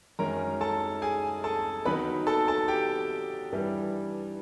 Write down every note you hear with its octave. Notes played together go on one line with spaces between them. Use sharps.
F#2 D#3 G#3 C#4 A#4 A#5
A4 A5
G#4 G#5
A4 A5
D#3 F#3 B3 D#4 B4 B5
A4 A5
A4 A5
G4 G5
G2 E3 G3